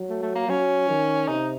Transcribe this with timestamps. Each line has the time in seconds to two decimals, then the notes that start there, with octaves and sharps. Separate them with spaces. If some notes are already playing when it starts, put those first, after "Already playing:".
Already playing: F#3
0.10 A3
0.22 A3
0.35 A#3
0.49 F#3 C#4
0.89 D#3
1.28 C3 D#4